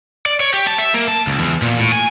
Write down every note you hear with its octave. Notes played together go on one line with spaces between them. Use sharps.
D5
C#5
G4
A5
E5
A#3
A5
C#2
E2
A#2
A2
G#5